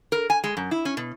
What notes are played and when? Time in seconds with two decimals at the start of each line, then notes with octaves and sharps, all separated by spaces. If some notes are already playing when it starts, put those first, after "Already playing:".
0.12 A#4
0.30 G#5
0.44 G#3
0.57 F#2
0.71 E4
0.85 C#4
0.97 B2